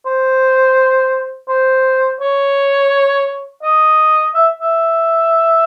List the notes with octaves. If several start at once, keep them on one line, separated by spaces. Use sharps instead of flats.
C5
C5
C#5
D#5
E5
E5